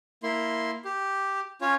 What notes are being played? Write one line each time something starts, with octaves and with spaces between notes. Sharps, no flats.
A#3 E4 C6
G4
C#4 F4 C#5